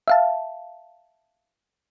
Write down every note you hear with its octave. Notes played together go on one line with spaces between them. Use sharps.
E5 F5 A5